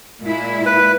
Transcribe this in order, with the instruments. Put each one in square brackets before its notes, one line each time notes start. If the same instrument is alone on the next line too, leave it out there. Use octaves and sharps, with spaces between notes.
[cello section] A#2 G#3 E4
[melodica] B4